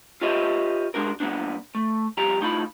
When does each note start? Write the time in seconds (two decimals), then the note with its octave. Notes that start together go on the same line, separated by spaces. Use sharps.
0.21 F4 G4 B4 C#5 D#5 E5
0.94 G#3 D4 F#4 A#4
1.20 F#3 A#3 B3 D4
1.75 A3
2.17 F2 G3 G4 A#5
2.40 A2 D#4 F4 B5